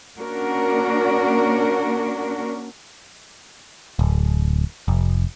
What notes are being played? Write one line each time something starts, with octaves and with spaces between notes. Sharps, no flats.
A#3 C#4 D4 F#4 A#4
D1
F1